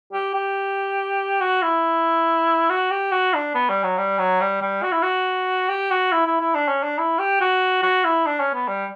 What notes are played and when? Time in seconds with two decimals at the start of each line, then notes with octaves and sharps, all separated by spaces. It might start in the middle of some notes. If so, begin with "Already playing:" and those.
0.13 G4
0.34 G4
1.41 F#4
1.63 E4
2.70 F#4
2.91 G4
3.12 F#4
3.34 D4
3.54 B3
3.70 G3
3.83 F#3
3.98 G3
4.19 F#3
4.41 G3
4.62 G3
4.83 F#4
4.92 E4
5.03 F#4
5.69 G4
5.91 F#4
6.12 E4
6.26 E4
6.40 E4
6.55 D4
6.68 C#4
6.83 D4
6.98 E4
7.19 G4
7.41 F#4
7.83 F#4
8.04 E4
8.26 D4
8.40 C#4
8.54 B3
8.68 G3